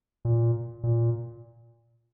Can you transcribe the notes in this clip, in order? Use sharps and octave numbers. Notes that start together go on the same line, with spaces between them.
A#2
A#2